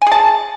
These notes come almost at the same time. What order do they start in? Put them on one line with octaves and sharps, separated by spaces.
G#5 G#4 A5